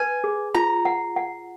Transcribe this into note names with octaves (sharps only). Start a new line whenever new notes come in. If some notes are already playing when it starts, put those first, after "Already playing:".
Already playing: B4 G#5
G#4
F4 A#5
F#5
F#5